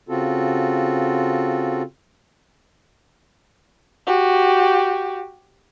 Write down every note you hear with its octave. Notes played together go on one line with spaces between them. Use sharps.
C#3 C4 F4 F#4 A4
F#4 G4